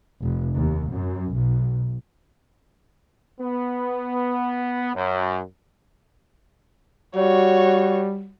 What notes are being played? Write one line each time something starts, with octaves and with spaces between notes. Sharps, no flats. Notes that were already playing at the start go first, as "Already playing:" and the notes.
F1
D#2
F#2
B1
B3
F#2
G3 F#4 C#5